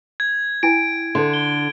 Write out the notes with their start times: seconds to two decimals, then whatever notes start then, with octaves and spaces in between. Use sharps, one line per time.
0.20 G#6
0.63 E4 G5 G#5 D7
1.15 D3 A4 C6
1.34 G7